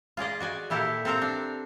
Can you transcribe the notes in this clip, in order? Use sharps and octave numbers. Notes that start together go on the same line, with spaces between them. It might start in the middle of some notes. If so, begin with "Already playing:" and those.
F4 G#4 D5 D#5
F#4 D5 G#5
A#2 E4 G4 A4 A#4
C4 A4 A#4 C5 F5 A#5
D4